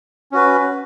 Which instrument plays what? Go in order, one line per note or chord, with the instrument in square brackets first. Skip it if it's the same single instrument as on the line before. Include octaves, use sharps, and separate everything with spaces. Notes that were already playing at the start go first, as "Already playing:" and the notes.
[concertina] C#4 F#4 B4